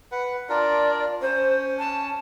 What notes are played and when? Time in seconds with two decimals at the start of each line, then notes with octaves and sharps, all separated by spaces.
0.12 B4 F#5
0.49 D4 F4 A#4 D5
1.22 C#4 C5
1.79 A5